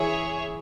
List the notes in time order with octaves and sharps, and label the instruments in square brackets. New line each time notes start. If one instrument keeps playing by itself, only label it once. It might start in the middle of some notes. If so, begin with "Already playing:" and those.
Already playing: [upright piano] E3 E4 [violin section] G#4 C#5 E5